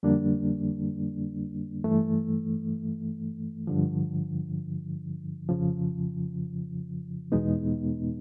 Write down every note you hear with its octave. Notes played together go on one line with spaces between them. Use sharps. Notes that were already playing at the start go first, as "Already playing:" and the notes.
F2 D3 G3 A#3 D4
G2 E3 A3
G2 D3 F3
F2 C#3 F3
E2 B2 G#3 B3 D#4